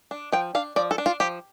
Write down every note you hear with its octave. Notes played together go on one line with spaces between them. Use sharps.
D4
F3 G5
D4 F5
F3 D5
A4
D4
F4
F3 G4